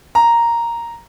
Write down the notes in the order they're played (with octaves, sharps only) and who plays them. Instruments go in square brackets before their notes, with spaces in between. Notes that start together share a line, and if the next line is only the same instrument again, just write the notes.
[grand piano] A#5